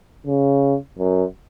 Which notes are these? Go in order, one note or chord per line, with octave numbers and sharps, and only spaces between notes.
C#3
F#2